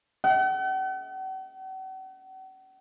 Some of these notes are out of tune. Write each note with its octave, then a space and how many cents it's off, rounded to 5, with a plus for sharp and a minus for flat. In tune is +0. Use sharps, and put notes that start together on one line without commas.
F#5 +45